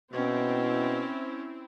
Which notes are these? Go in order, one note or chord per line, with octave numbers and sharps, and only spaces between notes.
B2 C4 C#4 E4